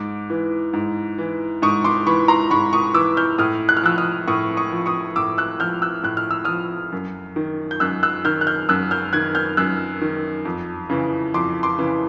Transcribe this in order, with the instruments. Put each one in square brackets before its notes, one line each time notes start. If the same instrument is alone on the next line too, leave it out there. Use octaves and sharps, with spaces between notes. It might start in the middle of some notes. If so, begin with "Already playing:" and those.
Already playing: [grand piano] G#2 D6
E3
G#2
E3
G#2 C#6 D#6
C6 D6
E3 B5 C#6
A#5 C6
G#2 B5 C#6
C#6 D#6
E3 D6 E6
F6 G6
A2 D#6 F6
F#6
F6
F3 E6 F#6
D#6 F6
A2 C#6 D#6
C#6 D#6
F3
C#6 D#6
A2 D6 E6
E6 F#6
F3 F6 G6
E6 F#6
A2 F#6
F6
E6
F3 D#6 F6
F#2
D#3
G6
F#2 E6 F#6
E6 F#6
D#3 F6 G6
F#6
F6 G6
F#2 E6 F#6
F6 G6
D#3 F#6 G#6
F6 G6
F#2 E6 F#6
D#3
F2
C#3 E3
F2 C6 D6
C6 D6
C#3 E3